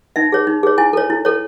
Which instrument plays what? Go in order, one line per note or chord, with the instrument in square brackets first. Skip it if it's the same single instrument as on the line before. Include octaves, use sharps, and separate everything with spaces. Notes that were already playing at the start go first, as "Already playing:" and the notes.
[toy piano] D#4 E5
G#4 C#5
D#4
G#4 C#5
E4 G#5
A4 C#5
E4
A4 C#5